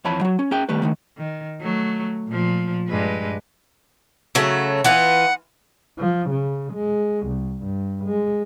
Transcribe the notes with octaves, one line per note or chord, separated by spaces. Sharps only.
F2 E3 C#5 A5 B5
F#3 F#4
C#4
C#4 G#4 G5
D#3 G3 A3 B4
D3 D#3 A3
D#3
F#3 A3
A#2 F3
G2 G#3 B4
C#3 F#3 A3
E3 B3 F4 F#5
F3
C#3
G#3
C2
G2
G#3